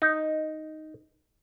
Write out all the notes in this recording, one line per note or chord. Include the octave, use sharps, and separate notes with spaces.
D#4